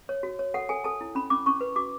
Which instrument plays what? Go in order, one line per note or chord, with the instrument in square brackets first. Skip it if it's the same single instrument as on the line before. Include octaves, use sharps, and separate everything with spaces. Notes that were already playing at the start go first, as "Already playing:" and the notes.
[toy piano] C#5
F#4
C#5
A4 F#5
A4 G#5
A4 A5
E4
C#4 B5
C#4 D6
C#4 C#6
B4
F#4 D6